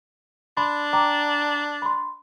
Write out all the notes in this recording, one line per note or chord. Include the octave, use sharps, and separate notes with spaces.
D4 B5 C6
G5 A#5 D6
B5 C6